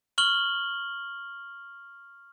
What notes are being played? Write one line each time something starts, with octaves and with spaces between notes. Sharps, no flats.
C#6 F6 F#7 G7